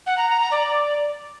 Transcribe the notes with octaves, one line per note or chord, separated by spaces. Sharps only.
F#5
A#5
A#5
A#5
D5